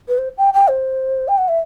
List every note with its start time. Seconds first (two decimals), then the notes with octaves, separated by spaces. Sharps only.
0.08 B4
0.18 C5
0.38 G5
0.54 G5
0.68 C5
1.28 G5
1.38 F#5
1.48 E5